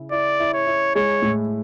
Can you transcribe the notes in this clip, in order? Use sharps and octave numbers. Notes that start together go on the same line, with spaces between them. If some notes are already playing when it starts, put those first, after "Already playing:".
Already playing: C#3 E4
E4 D5
E4
C#5
E4
G#3 C#5
A2